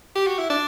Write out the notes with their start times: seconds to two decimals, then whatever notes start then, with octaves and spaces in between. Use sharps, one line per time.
0.15 G4
0.27 F#4
0.38 E4
0.50 D4